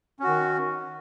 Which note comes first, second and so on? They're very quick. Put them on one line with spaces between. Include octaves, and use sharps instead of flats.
C#4 F#4 D#3